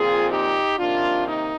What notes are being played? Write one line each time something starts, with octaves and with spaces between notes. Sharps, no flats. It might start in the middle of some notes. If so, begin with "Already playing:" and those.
Already playing: A#2 F3 C4 F4 G#4
D#4 G4
C3 D#3 A#3 D4 F4
D#4